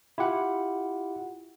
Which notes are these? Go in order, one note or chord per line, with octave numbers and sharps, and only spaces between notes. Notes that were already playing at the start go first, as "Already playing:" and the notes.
E4 F4 G4 F#5